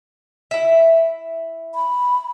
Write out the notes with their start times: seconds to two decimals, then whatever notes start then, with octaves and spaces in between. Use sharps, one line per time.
0.51 E4 E5
1.74 B5